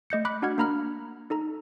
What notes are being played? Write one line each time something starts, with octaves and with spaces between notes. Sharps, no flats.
A3 D#5 G6 C#7
B5 D6 F#6 B6
D4 F#4 F#5 F6 G#6
A#3 D4 A#5 B5 F6
D#4 A4 A#5